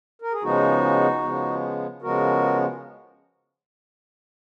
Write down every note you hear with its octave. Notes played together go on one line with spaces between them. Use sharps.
A#4
G#4
C#3 F3 G#3 B3 D#4 F#4
C#3 F3 G#3 B3
C#3 F3 G#3 B3 F#4 A#4